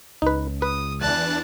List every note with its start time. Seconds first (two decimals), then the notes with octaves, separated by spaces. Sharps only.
0.22 C#2 D#4 B4
0.62 B4 D#6
1.01 E2 E3 D4 A5 F#6